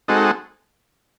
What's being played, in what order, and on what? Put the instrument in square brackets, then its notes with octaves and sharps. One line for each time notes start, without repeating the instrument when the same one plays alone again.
[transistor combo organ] G#3 C4 D#4 F#4 A4